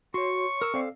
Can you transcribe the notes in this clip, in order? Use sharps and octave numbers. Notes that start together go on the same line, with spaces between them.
F#4 C#5 C6 C#6
A#4 E6
C4 A4 D5 F5